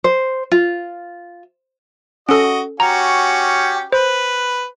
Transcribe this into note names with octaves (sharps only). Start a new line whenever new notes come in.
C5
F4
C#4 F#4 A4 D#5
C#4 F#4 G4 A#5
B4 C5